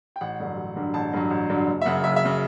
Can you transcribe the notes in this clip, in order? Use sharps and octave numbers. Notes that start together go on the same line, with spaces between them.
G5
A1 F#5
G2 D3 F#3
A1
G2 D3 F#3
A1 A5
G2 D3 F#3
A1
G2 D3 F#3
F#1
E5
F#2 C#3 F#5
F#1 E5
E5
C#3